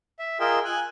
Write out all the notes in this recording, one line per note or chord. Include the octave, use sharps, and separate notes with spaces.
E5
F4 G#4 A#4 D#5 G5 E6
G#5 F#6